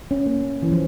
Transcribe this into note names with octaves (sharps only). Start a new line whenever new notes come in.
C#4
A#3
E3
F3